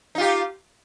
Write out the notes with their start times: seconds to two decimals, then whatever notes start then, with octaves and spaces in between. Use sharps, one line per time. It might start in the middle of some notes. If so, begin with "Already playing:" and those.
0.15 D#4
0.18 F4
0.21 G4